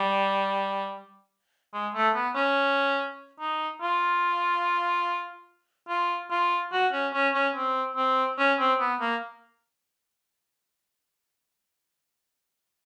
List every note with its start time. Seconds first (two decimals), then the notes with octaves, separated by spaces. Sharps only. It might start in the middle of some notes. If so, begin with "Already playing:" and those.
Already playing: G3
1.74 G#3
1.95 A3
2.15 B3
2.35 C#4
3.40 D#4
3.82 F4
5.89 F4
6.31 F4
6.73 F#4
6.93 C#4
7.14 C#4
7.34 C#4
7.55 C4
7.96 C4
8.39 C#4
8.59 C4
8.80 B3
9.01 A#3